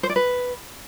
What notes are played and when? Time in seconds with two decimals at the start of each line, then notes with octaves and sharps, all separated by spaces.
0.03 C5
0.10 D5
0.16 B4